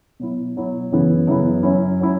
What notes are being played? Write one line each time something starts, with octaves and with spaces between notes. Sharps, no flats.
B2 F#3 E4
B2 F#3 E4
F#2 C#3 E3 B3 E4
F#2 C#3 E3 B3 E4
F#2 F#3 C#4 E4
F#3 C#4 E4